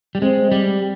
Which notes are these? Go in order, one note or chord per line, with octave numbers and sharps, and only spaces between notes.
G3
G#3 C4
G3